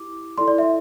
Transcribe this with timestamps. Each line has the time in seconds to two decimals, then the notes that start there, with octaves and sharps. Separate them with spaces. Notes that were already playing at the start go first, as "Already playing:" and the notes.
Already playing: E4 G4 D6
0.38 E4 A4 D5 C6
0.48 D5
0.58 E5